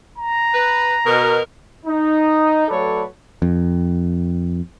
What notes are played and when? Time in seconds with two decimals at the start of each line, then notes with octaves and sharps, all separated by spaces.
0.18 A#5
0.54 B4
1.06 B2 A#4
1.86 D#4
2.68 F#3 A3 A4 B4 C#5 D5
3.42 F2